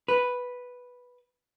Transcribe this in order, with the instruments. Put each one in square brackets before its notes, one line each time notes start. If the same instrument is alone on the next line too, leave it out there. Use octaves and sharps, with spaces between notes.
[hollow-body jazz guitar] B4